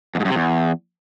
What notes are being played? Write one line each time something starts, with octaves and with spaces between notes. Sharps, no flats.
E2
G#2
F#2
C3
E2